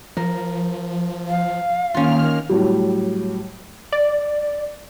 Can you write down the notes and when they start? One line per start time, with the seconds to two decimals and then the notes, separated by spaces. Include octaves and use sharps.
0.17 F3 A#4
1.27 F5
1.94 D#3 A#3 C#4 F4 F6
2.49 A2 F#3 G3
3.92 D5